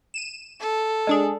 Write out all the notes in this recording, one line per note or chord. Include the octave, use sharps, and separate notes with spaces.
D#7 E7
A4
G#3 D4 G#4